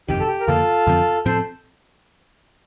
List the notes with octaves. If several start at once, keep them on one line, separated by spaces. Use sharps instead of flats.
G1 F2 C3 D#3 G4
A4
G4
A#4
F2 D3 F3 A#3 F4 A4
F2 D3 F3 C4
A2 F3 C4 A4 C5